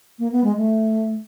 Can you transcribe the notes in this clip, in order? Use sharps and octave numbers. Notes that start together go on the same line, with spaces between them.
A#3
B3
G#3
A3